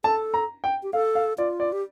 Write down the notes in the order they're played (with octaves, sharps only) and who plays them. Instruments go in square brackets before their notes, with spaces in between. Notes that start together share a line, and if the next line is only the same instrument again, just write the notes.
[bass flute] A4 [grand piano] A5
[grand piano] A#5
G5
[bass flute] G4
[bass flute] A4 [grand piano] F5
[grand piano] F5
[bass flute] F4 [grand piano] D5
[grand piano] D5
[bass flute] G4